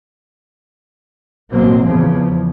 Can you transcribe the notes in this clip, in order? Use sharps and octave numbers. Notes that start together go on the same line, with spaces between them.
A1 B2 F#3 A#3 C4
E2 C#3 E3 F3